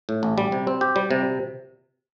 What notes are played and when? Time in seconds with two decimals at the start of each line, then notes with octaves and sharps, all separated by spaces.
0.09 A2
0.23 A1
0.38 G3
0.52 C3
0.67 C4
0.81 G4
0.96 G3
1.11 C3